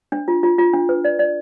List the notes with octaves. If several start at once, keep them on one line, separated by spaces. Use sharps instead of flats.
D4
F4
F4
F4
D4
B4
D5
D5